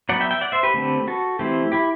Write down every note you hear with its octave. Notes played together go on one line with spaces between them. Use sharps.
F#3 B3 D5 F#5
E5 G5
E5 G5
D5 F#5
C5 E5
G4 B4
D3 A3 C4
F#4 A4
E3 A3 C4 E4 G4
E4 G4